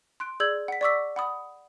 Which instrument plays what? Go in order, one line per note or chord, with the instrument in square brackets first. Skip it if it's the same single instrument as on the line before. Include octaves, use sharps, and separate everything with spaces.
[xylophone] C6 F#6 D7
G#4 D5 E6 G6 G#6 F#7
F#5 B6
D5 F#5 C#6 D6 E6 B6
F#5 B5 D#6